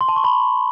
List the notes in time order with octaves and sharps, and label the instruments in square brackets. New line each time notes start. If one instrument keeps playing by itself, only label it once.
[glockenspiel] C6
A5
C#6
B5